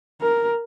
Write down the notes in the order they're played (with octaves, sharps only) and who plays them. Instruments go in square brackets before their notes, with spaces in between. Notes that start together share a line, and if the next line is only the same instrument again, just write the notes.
[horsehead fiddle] A#4